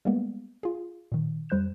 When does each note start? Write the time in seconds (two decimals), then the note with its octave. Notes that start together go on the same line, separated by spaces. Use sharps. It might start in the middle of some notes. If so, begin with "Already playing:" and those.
0.05 G3 G#3 A#3 B3
0.63 F4 G#4
1.12 A#2 D#3
1.49 F2 G3 C5 F#6 G6 E7